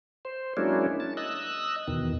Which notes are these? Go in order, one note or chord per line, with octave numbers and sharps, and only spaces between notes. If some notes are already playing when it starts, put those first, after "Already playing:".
C5
F#3 G#3 A#3 C#4 D4 E4
A5
D#5 E6 F#6
E2 B2 D#3